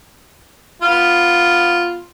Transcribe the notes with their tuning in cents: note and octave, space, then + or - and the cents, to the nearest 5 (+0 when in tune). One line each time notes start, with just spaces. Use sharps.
B3 +0 F4 +0